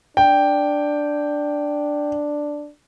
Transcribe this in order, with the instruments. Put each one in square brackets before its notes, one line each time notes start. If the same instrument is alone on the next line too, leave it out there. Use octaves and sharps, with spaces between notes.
[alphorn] D4 [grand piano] G5